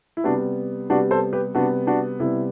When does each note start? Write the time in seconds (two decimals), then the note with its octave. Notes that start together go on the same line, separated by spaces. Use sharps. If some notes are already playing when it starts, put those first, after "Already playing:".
0.17 E4
0.24 C3 G3 B3 D4 F#4
0.90 C3 G3 B3 D4 F#4
1.11 A4 C5
1.33 G4 B4
1.55 C3 G3 B3 D4 F#4
1.87 D4 F#4
2.20 C3 G3 B3 E4